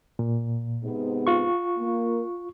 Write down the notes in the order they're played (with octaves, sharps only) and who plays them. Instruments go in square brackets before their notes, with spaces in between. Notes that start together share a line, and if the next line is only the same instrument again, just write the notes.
[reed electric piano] A#2
[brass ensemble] G#2 C3 B3
[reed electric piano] F4 C#6
[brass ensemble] A#3